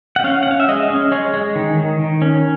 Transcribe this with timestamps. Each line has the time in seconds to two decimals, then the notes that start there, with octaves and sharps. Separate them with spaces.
0.16 F#5
0.24 C#4 F5
0.43 F#5
0.47 C#4 F5
0.60 E5
0.68 G#3 D#5
0.90 C#4
1.12 G#3 C#5
1.34 G#3
1.56 D#3
1.78 D#3
1.99 D#3
2.22 C#4